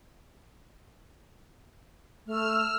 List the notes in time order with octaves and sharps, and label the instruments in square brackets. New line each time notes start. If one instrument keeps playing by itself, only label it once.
[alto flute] A3 [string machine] E6 F6